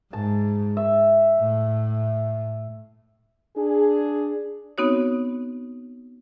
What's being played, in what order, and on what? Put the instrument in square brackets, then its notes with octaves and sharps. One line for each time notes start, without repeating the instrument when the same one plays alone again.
[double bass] G#2 [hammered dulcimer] A5
[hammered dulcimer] E5
[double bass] A2
[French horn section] D4 G#4
[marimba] B3 C4 D#4 F#4 C#5